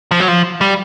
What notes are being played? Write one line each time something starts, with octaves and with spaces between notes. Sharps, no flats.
F3
F#3
F3
G3